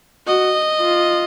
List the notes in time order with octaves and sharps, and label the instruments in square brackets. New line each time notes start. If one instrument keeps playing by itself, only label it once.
[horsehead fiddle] F#4 [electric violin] D#5
[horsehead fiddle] F4